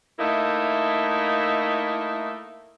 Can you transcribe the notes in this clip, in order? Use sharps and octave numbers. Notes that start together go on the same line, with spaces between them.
A3 A#3 D#4 E4